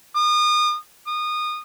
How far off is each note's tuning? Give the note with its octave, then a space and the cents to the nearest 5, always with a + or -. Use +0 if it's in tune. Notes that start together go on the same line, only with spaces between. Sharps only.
D#6 -35
D#6 -25